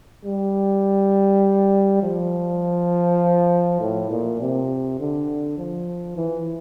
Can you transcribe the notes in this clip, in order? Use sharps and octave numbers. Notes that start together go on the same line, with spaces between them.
G3
F3
A2
A#2
C3
D3
F3
E3